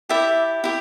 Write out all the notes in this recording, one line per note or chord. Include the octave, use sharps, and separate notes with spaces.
E4 G4 D5 E5
E4 G4